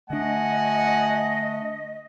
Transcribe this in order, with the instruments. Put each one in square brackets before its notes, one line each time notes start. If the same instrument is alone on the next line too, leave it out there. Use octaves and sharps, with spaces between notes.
[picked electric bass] D3 D4 [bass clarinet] A3 [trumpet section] F#4 F#5 G#5 [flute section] D#5